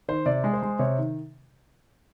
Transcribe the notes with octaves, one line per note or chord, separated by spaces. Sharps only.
D#3 C5
C3 D5
G#3
C5
G#3
C3 C#5
D#3